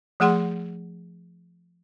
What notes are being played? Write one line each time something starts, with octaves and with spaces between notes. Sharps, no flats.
F3 A3 G#4 F#5 C6